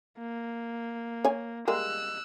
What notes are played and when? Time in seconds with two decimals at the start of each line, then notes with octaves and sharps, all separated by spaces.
0.19 A#3
1.25 C#5 G#5
1.68 G3 G#3 A#3 E6 F#6